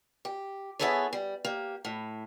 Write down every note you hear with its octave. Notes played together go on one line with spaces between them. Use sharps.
G4
B3 E4 G#4 A4 B4 C#5
G3
A#3 G4
A2